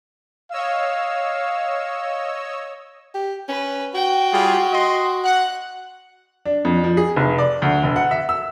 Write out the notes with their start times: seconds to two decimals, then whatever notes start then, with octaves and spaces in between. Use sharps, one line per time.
0.51 C#5 D#5 F5 E6
3.14 G4
3.49 C#4 B4
3.94 F#4 G5
4.33 G3 F4 G#4
4.73 D#5 C6
5.24 F#5 F#6
6.45 D4
6.65 F2
6.84 F3
6.97 G#4
7.16 F1
7.38 D5
7.62 D2
7.83 E1
7.96 F#5
8.11 E5
8.29 E6